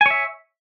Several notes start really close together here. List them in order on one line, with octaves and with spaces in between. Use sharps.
G#5 C#5 E5